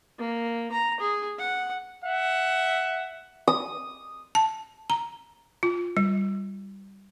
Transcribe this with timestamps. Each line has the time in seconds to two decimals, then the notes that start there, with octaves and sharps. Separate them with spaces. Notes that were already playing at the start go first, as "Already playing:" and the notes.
0.18 A#3
0.72 A#5
1.00 G#4
1.39 F#5
2.05 E5 F#5
3.48 D#6
4.35 A5
4.90 A#5
5.63 F4
5.97 G3